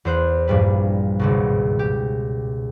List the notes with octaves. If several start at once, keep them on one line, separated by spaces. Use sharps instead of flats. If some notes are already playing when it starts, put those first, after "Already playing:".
E2 C5 F#6
A#1 G2 G3 B4
G#1 C#2 B2
G4